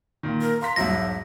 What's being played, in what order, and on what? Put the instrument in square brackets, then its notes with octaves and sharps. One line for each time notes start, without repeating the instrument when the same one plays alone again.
[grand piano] A#2 D#3
[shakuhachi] A#4
[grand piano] F5 C6 B6 [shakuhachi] A#5
[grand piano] E1 B1 G#2 [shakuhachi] E5 [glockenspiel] A#6